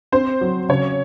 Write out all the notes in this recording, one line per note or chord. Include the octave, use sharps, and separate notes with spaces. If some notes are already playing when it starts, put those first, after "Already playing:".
C4 C5
F#3
C#3 C#5